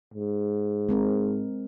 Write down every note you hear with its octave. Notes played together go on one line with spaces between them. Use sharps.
G#2
G#3 C4 A#4